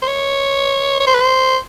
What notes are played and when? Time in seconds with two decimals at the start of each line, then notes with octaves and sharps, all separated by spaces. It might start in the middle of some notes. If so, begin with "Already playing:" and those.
0.02 C5
0.08 C#5
1.00 C#5
1.07 C5
1.14 B4
1.21 C5